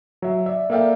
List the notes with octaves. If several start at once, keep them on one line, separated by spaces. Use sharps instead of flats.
F#3 E5
D5 E5
A#3 A4 D5 E5 F5 G5